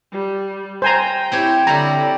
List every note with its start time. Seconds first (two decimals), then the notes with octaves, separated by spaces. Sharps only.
0.11 G3
0.82 C5 G5 G#5 A#5
1.32 C4 E4 G4 C#5
1.67 D3 G3 E4 G4 D5 A#5